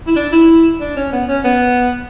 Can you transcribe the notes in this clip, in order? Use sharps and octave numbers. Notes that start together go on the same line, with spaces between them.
E4
D4
E4
D4
C#4
B3
C#4
B3